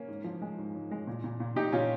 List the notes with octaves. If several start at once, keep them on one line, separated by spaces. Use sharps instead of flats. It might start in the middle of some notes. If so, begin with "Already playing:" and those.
Already playing: A#3 C#4
G#2
F3
G#3
G#2
G#2
G#3
A#2
A#2
A#2
A#2 D#4 G4
A#2 C#4 F4